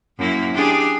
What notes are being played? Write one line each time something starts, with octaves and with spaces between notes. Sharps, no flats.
F#2 A#3 E4
D4 G4 G#4